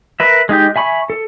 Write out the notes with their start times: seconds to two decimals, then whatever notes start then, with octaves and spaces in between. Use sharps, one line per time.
0.20 A#4 B4 E5
0.49 G#3 D#4 G4 G6
0.76 E5 G#5 B5 C#6
1.10 A4